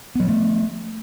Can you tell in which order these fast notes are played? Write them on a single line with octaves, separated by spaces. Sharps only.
B3 F#3 F3 A3